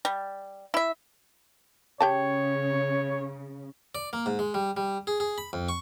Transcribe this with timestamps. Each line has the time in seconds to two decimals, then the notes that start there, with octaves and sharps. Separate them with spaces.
0.05 G3
0.74 E4 E5
2.01 C#3 G4 C#5 G5 A5
3.95 D5
4.13 A#3
4.26 G#2
4.39 G#3
4.54 G3
4.77 G3
5.07 G#4
5.20 G#4
5.38 B5
5.53 F2
5.69 C#6